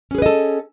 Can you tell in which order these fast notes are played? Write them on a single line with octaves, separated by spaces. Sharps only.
C#4 G#4 B4 D#5 A4